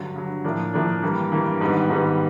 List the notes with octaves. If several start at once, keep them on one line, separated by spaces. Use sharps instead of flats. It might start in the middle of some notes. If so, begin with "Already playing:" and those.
Already playing: G2 D3 F#3
G2 D3 F#3
A2 F3 A#3 D4
A2 F3 A#3 D4
G2 E3 G3 A#3
G2 E3 G3 A#3
G#2 D#3 G3 B3
G#2 D#3 G3 B3